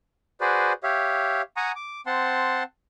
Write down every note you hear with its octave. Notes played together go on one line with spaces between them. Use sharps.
F#4 G#4 B4 C5 D5
G4 C#5 E5 F5
F#5 G#5 A#5 C#6 D#6
D6
C4 F#5 A5 C6